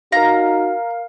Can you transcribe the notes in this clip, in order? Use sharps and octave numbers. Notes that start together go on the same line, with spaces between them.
D#4 F#4 A#4 F5 A#5